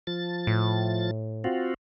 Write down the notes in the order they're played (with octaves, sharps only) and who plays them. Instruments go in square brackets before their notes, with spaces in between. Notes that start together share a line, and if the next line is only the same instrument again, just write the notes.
[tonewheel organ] F3 A6
[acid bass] A2
[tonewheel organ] C4 F4 F#4